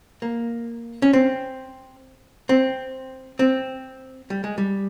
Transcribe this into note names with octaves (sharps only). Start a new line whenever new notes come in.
A#3
C#4
C4
C4
C4
G3
G#3
G3